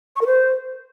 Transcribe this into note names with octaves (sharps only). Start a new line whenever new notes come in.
C#6
A#4
C5